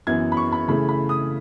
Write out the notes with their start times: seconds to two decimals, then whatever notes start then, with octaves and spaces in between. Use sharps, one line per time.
0.07 F#2 E3 B3 G#6
0.32 B5
0.37 C#6
0.52 B5
0.68 C#3 E3 A3 B5
0.89 B5
1.09 D#6